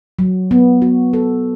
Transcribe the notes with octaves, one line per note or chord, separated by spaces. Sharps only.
F#3
B3
F#4
A4